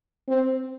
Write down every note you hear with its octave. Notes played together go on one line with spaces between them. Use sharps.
C4